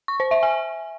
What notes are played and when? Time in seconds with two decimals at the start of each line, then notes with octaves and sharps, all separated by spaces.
0.08 C#6
0.20 C5
0.31 E5
0.43 G#5